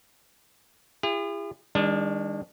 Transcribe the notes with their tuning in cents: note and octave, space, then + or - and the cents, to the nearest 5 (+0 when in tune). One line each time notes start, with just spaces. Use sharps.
E4 +40 G#4 -45
D#3 +20 G#3 -45 D4 -5